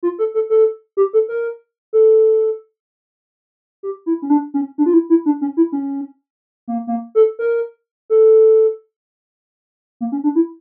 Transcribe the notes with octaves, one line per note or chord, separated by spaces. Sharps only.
F4
A4
A4
A4
G4
A4
A#4
A4
G4
E4
C#4
D4
C#4
D4
F4
E4
E4
D4
C#4
E4
C#4
A#3
A#3
A4
A#4
A4
A#3
C#4
D4
E4